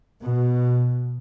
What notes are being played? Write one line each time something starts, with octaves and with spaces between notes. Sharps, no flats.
B2